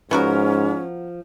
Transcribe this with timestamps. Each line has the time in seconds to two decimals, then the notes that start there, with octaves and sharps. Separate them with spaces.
0.11 G#2 F3 B3 C#4 F#4 A#4